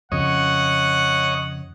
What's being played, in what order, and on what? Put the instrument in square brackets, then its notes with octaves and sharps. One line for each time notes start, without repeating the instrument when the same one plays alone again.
[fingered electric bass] F2 C#3 [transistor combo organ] C#5 D#5 [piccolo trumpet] F#5